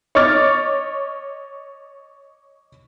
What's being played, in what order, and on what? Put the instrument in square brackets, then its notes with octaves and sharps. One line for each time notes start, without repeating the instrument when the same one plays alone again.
[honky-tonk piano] C#5 D#5 C#6 D6 F6 A6